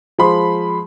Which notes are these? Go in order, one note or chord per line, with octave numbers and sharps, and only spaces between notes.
F3 G#3 B5 C6